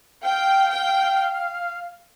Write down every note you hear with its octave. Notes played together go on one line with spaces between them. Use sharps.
F5 G5
G5